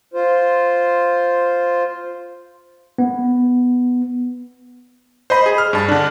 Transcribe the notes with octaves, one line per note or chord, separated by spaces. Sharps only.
F4 C5
B3
C5 D#5 B5
G#4
F6
G2 A5
D3 D4